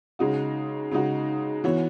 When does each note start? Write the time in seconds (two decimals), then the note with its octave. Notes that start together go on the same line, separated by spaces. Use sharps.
0.19 C#3 G#3 D#4 F#4
0.91 C#3 G#3 D#4 F#4
1.64 E3 B3 F#4 C#5